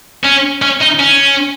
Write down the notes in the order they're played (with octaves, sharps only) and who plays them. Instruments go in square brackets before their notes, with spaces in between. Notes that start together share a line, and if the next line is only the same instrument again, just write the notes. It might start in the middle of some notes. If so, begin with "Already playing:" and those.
[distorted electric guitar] C#4
C#4
D#4
C#4